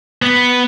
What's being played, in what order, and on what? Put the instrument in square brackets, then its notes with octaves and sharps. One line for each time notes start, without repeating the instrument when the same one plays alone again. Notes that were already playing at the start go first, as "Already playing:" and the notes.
[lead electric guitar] B3